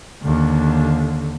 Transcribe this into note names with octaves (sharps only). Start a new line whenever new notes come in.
D#2 D3